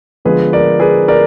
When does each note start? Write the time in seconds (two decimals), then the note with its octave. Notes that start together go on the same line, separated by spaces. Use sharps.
0.25 D3 F3 G#3 B3 G#4 B4
0.53 A#4 D5
0.80 G#4 B4
1.08 A#4 D5